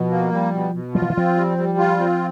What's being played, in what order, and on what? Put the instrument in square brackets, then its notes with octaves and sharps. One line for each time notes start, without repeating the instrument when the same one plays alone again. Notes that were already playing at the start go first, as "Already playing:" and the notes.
Already playing: [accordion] B2 [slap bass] F3
[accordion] A#3
G3
B2
B2
[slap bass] F#3 [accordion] F4
[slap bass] F3
E3
[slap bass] F3 [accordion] C4
[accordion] G3
G3
F4
C4